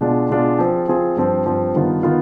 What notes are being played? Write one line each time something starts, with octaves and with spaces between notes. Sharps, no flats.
B2 G#3 D4 F4
B2 G#3 D4 F4
F3 C4 F4 G#4
F3 C4 F4 G#4
G2 F3 C4
G2 F3 C4
G2 D#3 B3 F4
D#3 B3 F4